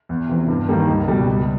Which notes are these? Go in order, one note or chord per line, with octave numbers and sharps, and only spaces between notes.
E2
C3 E3
G2
D#3 G3 A#3
C#2
B2 G3
C#2